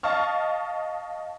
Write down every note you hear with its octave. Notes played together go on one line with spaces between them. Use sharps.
D#5 F5 A5 C#6 F6